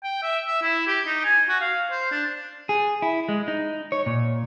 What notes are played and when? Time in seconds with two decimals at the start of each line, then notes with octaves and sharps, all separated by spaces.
0.04 G5
0.23 E5
0.47 E5
0.62 E4
0.88 G4
1.06 D#4
1.25 G#5
1.49 F#4
1.61 F5
1.91 C5
2.11 D4
2.69 G#4
3.02 E4
3.29 G#3
3.48 D#4
3.92 C#5
4.06 A#2